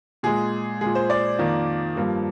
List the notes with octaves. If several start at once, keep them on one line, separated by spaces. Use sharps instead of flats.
A#2 G#3 G#4
A#2 G#3 G#4
C5
D5
F2 D#3 A#3
G2 F3 A#3